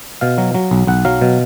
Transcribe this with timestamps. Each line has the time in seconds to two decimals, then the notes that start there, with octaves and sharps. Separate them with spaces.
0.21 B2 F5
0.38 F#3
0.55 F#3
0.71 B1
0.87 B1 F#5
1.05 F#3 F5
1.21 B2